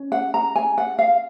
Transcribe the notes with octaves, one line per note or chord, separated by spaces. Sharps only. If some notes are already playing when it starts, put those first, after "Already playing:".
Already playing: C#4
F#5
A#5
G#5
F#5
F5